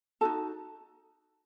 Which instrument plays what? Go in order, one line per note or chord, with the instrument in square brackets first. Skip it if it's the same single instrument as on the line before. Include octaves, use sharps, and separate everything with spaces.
[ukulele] D#4 F#4 A4 A5